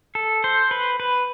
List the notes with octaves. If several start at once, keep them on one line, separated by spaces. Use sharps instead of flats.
A4
C5
B4
B4